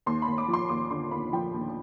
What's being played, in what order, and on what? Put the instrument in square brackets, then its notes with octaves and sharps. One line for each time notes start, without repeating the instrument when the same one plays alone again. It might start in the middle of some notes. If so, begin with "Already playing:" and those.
[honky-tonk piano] D#2 C6
B5
D#2
D6
F3
C6
D#2 D6
D3 C6
D#2 B5
F3 G5
D#2